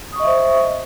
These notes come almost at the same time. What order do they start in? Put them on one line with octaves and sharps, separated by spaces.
D#6 C#6 D#5 E5 C5